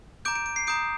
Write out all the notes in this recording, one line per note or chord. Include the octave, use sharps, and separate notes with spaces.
A#5 D6 G6 D7
D7
D7
C7
A#5 D#6 G6 D7